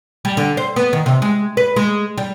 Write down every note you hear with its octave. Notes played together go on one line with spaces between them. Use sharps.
G3
D3
C5
B3
D#3
C3
G#3
B4
G#3
G3